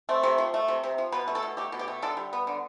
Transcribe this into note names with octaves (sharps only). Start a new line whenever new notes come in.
A3 C4
C3
F3
A3
C3
C3
F3
B2 B4
A3
A4
B2
A3 G4
B2
G4
A3
D3 A4
G3
B3
D3